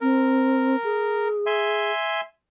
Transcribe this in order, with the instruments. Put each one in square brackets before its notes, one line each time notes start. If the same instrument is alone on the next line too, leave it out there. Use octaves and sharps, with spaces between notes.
[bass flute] C4 [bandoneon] A#4
[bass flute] G#4
[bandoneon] E5 G#5 C6